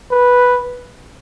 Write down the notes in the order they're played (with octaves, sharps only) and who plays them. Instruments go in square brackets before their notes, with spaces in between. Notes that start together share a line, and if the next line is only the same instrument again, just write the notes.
[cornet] B4